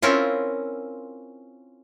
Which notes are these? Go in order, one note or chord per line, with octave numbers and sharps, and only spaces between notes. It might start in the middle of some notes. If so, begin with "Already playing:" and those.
C4 C#4 E4 F4 A#4